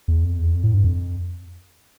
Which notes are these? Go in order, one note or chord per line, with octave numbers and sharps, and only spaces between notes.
E2
F2
E2
F2
A2
G2
F2